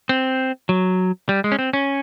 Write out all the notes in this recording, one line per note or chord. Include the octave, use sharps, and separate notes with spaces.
C4
F#3
G3
G#3
C#4
C4
C#4